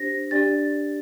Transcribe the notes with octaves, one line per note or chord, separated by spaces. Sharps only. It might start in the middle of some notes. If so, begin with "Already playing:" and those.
Already playing: D4 G4 C5 A#6
D4 G4 D5 A6